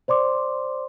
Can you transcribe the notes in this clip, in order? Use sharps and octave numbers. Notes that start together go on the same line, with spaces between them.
C5 D5 C6 D6